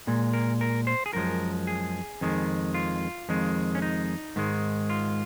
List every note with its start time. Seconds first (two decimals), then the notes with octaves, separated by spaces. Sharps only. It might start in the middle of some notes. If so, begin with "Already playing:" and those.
0.07 A#2 G#3
0.33 A#4
0.61 A#4
0.87 C5
1.06 G#4
1.13 F#2 F3 G#3 A#4
1.67 G#4
2.21 F2 D#3 G#3
2.74 F4
3.29 F2 D#3 G#3
3.75 C#4
3.82 D#4
4.36 G#2 D#3 G#3
4.90 F4